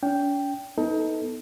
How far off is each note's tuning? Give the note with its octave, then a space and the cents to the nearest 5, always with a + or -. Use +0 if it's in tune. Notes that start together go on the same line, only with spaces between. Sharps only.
C#4 +45 G5 +0
B3 +0 D#4 +30 A4 +5